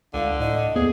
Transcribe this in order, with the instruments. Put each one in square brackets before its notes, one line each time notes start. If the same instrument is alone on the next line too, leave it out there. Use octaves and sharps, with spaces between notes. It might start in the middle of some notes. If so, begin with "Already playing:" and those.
[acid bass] C#2 [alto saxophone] D3 [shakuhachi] F5
[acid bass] A2 [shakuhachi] D#5
[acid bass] D#2 [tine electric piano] B3 [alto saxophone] G#4